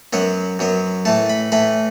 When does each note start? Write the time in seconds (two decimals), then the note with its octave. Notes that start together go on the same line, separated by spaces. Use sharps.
0.13 F#2 F#3 B3 F#5
0.59 F#2 F#3 B3
1.05 A2 E3 A3 A5
1.30 B5
1.52 A2 E3 A3 B5